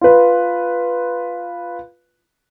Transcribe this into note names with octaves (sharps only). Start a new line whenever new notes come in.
F4 B4